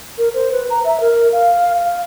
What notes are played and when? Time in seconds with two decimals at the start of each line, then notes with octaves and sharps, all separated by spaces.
0.18 A#4
0.34 C5
0.52 B4
0.70 A#5
0.85 E5
1.00 A#4
1.32 F5
1.76 F5